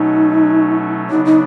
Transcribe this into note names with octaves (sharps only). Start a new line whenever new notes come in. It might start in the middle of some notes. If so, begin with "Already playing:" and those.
Already playing: B2 F#3 A3 C#4 D#4
C#3 F#3 B3 D4 D#4
D#4